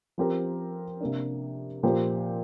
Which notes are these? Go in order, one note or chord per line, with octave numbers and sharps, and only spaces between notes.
F3 C4 G4 A#4
C3 A#3 D4
A#2 F3 A#3 G4 C5